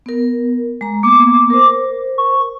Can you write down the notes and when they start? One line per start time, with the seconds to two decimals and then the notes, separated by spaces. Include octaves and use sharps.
0.06 B3 A#4
0.81 G#3 A#5
1.03 A#3 B3 D6
1.50 A#4 C5
2.18 C#6